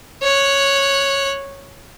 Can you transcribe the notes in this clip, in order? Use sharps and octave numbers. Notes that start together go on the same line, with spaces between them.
C#5 F#6